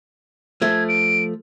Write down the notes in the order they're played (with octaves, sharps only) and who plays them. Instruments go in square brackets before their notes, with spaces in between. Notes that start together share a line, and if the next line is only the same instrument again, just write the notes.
[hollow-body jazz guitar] F3 A3 [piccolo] G#6
[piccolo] D7